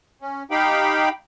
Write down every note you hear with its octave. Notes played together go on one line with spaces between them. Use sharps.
C#4
D#4 G4 F5 G5 B5